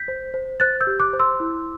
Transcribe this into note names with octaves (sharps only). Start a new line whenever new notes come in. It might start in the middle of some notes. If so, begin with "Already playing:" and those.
Already playing: G6 B6
C5
C5
C5 F#6 A6
E6 G6
G4
D6 F#6
C5
C6 E6
E4